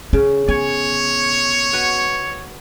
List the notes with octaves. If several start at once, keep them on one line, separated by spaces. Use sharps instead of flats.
C#3 C#4
B3 C#5 G#5
F#4 B4